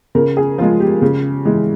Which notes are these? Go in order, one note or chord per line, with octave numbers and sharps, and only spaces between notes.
C#3 A#4
G#4
F3 G#3 F4
G4
C#3
E3 G#3